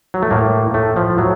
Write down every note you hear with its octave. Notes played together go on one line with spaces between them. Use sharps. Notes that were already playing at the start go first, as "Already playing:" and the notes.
F#3
A3
A2 A#3
A2 A3
F3
A2 F#3